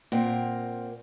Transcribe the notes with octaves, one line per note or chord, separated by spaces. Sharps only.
A#2 C4 A#4 F#5